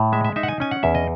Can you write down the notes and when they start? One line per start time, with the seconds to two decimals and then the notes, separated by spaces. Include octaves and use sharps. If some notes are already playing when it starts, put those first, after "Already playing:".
Already playing: A2
0.12 G#3 E5
0.25 E5
0.36 D#4 E5
0.43 F#5
0.48 G#5
0.60 C#4 G#5
0.71 F#5
0.83 E2 E5
0.95 D#5